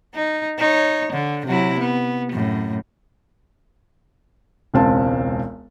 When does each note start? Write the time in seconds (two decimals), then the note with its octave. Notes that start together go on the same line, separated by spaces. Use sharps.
0.15 D#4
0.59 D#4 C#5
1.12 D3
1.47 C3 F#3 E4
1.79 B3
2.32 F#2 A2
4.74 E1 C#2 C4 A5